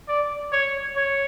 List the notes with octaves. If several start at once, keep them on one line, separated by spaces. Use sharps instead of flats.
D5
C#5
C#5